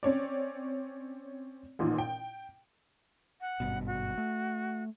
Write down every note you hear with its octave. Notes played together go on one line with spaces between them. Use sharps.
C4 C#4 C#5 D5
A1 A#2 D#3
G5
F#5
G#1 G2 B2
F#4
A3